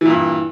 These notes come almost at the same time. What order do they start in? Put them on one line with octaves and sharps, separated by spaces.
E3 A#2 G2